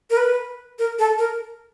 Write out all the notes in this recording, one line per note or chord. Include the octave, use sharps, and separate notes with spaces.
A#4
B4
A#4
A4
A#4